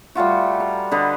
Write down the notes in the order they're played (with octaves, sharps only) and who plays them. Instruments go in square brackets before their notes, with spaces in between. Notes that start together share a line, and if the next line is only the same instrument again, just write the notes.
[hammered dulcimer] G3 A3 F4 F#4
A#5
D3 B4 D#5